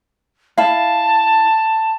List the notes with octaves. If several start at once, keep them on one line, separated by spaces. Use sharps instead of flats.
E4 F5 A5